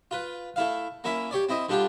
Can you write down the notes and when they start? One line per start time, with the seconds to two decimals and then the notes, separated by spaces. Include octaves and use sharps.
0.11 F4 B4
0.56 A3 E4 F5
1.04 A#3 C#4 E4 E5
1.31 G4 C#5 D5
1.49 C4 E4 D#5
1.69 D3 G3 D4 F4 G4